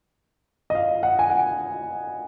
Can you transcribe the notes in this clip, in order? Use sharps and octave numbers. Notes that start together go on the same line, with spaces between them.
D#5
F5
F#5
G#5
F#5